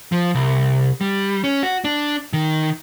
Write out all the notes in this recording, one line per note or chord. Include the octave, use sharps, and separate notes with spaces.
F3
C2
G3
C#4
F#4
D4
D#3